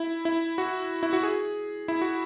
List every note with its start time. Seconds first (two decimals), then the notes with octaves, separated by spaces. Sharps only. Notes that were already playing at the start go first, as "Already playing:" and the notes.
Already playing: E4
0.25 E4
0.58 F#4
1.03 E4
1.13 F#4
1.23 G#4
1.88 E4
2.02 F#4